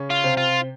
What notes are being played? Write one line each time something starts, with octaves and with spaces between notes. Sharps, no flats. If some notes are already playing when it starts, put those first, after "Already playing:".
Already playing: C#3 C#4
F4
C3 C4
F4